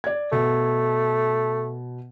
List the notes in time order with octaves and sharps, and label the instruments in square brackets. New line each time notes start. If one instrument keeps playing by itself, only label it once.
[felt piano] D5 G#6
[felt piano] B2 [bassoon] A3